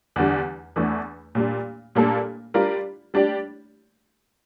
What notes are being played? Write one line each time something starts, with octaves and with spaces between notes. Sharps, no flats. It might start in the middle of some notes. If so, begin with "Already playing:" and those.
E2 D3 G3 D4
E2 E3 A3 D4
A#2 G3 D4
A#2 G3 A#3 D4 A4
G3 D4 F4 A#4 D5
G3 D4 G4 D5